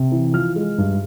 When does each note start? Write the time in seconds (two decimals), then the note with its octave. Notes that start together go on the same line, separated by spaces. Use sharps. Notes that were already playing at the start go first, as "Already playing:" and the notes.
Already playing: C3
0.12 E3
0.34 F3 F6
0.56 G#3
0.78 G2